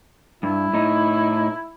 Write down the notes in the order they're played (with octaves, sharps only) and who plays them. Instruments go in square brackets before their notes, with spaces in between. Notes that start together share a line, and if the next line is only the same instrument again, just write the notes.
[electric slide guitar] G2 [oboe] E4
[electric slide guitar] A2 D#4